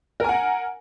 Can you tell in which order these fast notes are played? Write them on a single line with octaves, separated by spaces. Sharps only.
A#4 G#5 F#5